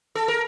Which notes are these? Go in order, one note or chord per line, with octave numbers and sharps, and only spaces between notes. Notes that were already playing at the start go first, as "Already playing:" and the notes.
A4
A#4